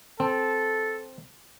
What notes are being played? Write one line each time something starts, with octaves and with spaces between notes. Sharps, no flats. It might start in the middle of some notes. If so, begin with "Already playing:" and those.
C4 A4